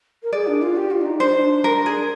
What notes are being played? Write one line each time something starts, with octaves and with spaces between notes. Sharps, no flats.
A#4
G#4 D5
D4
F4
G4
F4
D4
D#4
D4 C5
D#4
D4
A#4
G#4